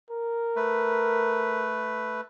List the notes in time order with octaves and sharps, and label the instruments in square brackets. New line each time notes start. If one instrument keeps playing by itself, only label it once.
[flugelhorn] A#4
[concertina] A3 B4